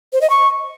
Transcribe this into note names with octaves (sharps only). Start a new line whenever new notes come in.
C5
D#5
C#6